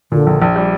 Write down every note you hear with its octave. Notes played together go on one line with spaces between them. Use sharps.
A#2 D3
A#1
A#1
G3